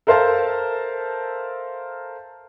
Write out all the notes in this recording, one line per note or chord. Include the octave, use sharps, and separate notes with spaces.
A4 A#4 C5 E5 F5 A5